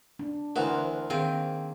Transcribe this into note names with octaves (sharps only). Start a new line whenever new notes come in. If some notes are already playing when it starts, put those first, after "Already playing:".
D4
D2 E3 F#4 A#4 C5
D#3 A#3 C4 G#4